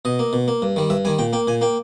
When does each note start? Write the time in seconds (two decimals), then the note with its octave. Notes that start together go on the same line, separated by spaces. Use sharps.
0.05 B2 D#5
0.19 A#3
0.33 B2
0.48 A#3
0.62 G2
0.76 D#3 G3
0.90 G2 E5
1.05 D#3 G3 G#5
1.19 A#2 G5
1.33 A#3 G5
1.48 A#2 G#5
1.61 A#3 G5